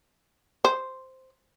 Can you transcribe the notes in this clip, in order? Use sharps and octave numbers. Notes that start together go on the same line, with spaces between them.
C5